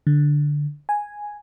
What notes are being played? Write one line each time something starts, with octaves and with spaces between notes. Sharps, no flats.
D3
G#5